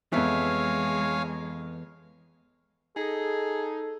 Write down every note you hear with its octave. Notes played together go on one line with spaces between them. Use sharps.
F2 E3 G#3 B3 C#5 E5 F5 G#5
D#4 G#4 A4